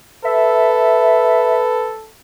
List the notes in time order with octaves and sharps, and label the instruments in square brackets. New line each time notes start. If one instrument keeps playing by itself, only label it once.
[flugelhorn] A4 [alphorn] B4 [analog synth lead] E5